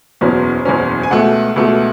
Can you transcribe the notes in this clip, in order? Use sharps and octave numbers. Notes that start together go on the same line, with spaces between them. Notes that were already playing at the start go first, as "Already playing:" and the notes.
F#1 E2 B2 F#3 C#4
F#1 E2 B2 F#3 C#4
G#5
C#2 B2 A3 F#5
C#2 B2 A3